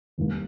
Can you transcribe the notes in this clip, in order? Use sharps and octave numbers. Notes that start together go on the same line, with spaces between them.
F1 D#2 D#3 G3 A#3